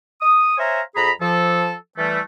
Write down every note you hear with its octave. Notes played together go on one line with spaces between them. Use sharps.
D#6
C5 C#5 E5 F5 G#5 A#5
F2 G#4 A#5 B5
F3 A4
E3 G3 A3